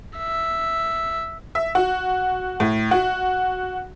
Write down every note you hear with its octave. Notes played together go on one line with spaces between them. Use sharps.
E5
E5
F#4
A2
F#4